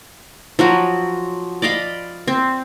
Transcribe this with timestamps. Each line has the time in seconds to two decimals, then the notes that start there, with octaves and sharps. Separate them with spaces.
0.59 F3 F#3 F#4
1.62 D5 D#5 F5 B5
2.27 C4